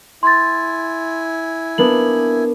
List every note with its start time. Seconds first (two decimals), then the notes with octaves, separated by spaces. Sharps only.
0.23 E4 G#5 C6 A6
1.78 A#3 B3 D4 F#7